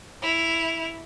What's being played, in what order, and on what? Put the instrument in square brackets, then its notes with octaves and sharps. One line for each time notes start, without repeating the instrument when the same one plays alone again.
[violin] E4 F7